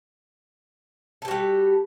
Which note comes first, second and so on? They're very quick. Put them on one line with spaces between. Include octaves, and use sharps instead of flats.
A4 G4 F#4 G3